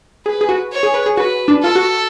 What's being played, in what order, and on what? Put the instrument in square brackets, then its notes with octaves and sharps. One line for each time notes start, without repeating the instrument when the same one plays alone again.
[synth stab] G#4 [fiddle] B4
[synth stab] G#4
F#4
[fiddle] C#5
[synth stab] G#4
B4
G#4
[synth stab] F#4 [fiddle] B4
[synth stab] D4
[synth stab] F4 [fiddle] A4
[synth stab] F#4